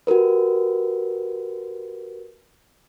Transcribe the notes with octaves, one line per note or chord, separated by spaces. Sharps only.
F#4 G4 A#4 B4